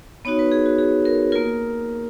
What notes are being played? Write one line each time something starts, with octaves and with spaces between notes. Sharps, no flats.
B3 D#4 F#4 C#5
B4
G#4
F#4
G#4
A#4
A#3 F4 A#4